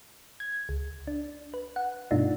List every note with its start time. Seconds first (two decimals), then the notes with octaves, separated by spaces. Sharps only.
0.40 G#6
0.69 C#2
1.07 D4
1.54 B4
1.76 F#5
2.11 G2 B2 A3 D4 D#4 F4